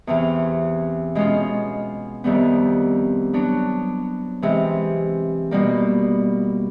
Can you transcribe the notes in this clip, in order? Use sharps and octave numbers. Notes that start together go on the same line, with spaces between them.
E2 C3 E3
B2 G#3 C#4 F4
F2 C3 D#3 G3 B3
F#3 B3 D4 F#4
C3 E3 G#3
B2 G3 A#3